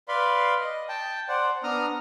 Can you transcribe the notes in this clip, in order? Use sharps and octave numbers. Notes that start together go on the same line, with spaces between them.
B4 D5 F5 B5 C6
D#5
G5 A5
C5 D5 F#5
B3 D4 A#5 D#6 F6